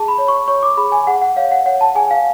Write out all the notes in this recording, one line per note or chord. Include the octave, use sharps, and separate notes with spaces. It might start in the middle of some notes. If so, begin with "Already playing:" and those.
Already playing: G#4 A5
B5
C#5
C#6
C#5 C#6
D6
G#4 B5
G#5
G#4 F#5
F#5
C#5 F5
F#5
C#5 F#5
A5
G#4 G#5
F5